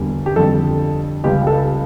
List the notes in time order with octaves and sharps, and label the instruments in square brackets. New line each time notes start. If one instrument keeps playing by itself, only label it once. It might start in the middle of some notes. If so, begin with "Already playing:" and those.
Already playing: [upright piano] E1 E2 D3 G3
G4
F2 D3 G3 A4
C#2 C#3 G3 G4
A4